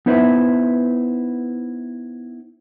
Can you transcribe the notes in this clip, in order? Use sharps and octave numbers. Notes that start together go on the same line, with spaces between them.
B3 D#4 E4 B4 C5 E5